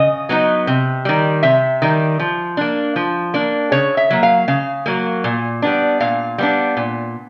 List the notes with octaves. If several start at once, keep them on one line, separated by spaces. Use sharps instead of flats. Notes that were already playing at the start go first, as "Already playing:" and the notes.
Already playing: C#3 D#5
F#3 B3 D#4
C3
D#3 G3
C3 E5
D#3 G3
F3
A#3 D4
F3
A#3 D4
C#3 C#5
E5
F#3 A#3
F5
C#3 F5
F#3 A#3
A#2
G3 B3 D4
A#2 F5
G3 B3 D4
A#2